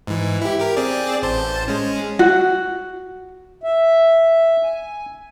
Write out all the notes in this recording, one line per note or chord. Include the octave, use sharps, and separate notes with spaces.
G#2 E3
E4 G4
G4 A#4
C4 G#4 D5
A1 C5 A5
G#3 C#4
F#4
E5
G#5